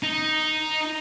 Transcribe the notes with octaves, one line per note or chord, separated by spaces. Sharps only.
D#4